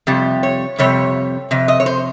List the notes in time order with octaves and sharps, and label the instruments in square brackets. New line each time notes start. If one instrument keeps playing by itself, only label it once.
[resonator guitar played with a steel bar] F2 C3 G3 G4
C#5
F2 C3 G3 C#5
F2 C3
D#5
C#5
C5